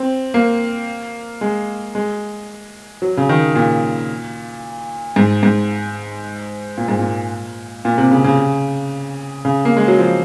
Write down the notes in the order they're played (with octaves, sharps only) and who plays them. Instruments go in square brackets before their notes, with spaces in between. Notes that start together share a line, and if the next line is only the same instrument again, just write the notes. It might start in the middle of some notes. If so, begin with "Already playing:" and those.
Already playing: [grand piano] C4
A#3
G#3
G#3
F#3
C#3
D#3
A#2
G#2
G#2
A#2
G#2
A#2
A#2
C3
C#3
C#3
C#3
A#3
G#3
F#3
F3